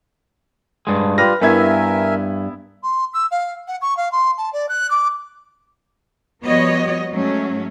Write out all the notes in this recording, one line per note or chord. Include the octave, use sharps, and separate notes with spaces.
G2 G#3
G3 F4 G4 B4 F6 A#6
G2 B3 E4 A#4 E5 G#5 G#6
C6
E6
F5
F#5
C#6
F5
C6
A5
D5
F#6
D6
F3 G3 B3 F#4 C#5 D#5
G#2 F#3 A3 C#4